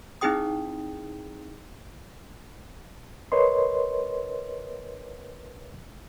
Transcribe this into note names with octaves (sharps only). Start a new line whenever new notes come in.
C4 D#4 E4 G#4 G5 D#6
A#4 B4 C#5 D#5 C6